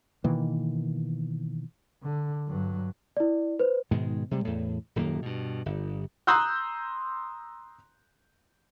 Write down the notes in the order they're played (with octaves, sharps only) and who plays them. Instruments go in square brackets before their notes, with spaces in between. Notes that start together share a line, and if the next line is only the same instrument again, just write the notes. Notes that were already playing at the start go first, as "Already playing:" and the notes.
[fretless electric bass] B2 D#3 E3 A#3
[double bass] D3
G2 F#3
[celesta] E4 D5
B4 C5
[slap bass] G#2 B2 D#3 G#3
C3 G3 G#3
E2 A2
D#1 F#2 D#3 A#3
G2 B2
G1
[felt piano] A#5 C6 D#6 E6 F#6 G6